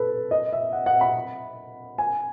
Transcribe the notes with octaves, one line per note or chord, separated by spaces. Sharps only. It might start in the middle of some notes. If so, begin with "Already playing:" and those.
Already playing: A4 B4
D#5
E5
F#5
F#5
B5
G#5